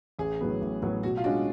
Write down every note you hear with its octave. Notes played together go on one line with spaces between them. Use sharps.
A1 G#4
A2 F#3 B3
A1
A2 F#3 B3
B2 F#4
F4
G#3 C#4 D4 F#4